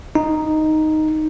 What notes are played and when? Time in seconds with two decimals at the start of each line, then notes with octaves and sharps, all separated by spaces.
0.15 D#4